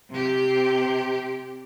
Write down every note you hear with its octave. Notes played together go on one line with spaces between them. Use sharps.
C3 G4